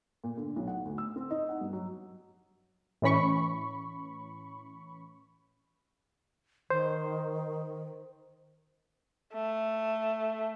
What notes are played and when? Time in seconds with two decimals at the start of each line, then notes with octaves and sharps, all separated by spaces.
0.24 A#2
0.37 D3
0.56 B1
0.68 F#5
0.85 D2
0.98 E6
1.16 C4
1.31 D#4
1.49 F#5
1.61 G2
1.73 F#3
3.02 A2 E3 C#4 B5 C#6
6.70 D#3 C5
9.34 A3